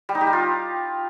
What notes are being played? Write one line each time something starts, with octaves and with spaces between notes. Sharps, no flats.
G3
D#4
G4
G3
F4